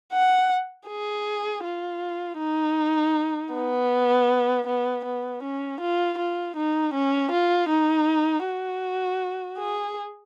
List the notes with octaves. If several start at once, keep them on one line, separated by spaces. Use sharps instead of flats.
F#5
G#4
F4
D#4
B3
B3
B3
C#4
F4
F4
D#4
C#4
F4
D#4
F#4
G#4